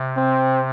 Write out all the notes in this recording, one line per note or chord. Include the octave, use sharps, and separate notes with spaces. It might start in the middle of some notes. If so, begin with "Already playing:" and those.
Already playing: C3
C4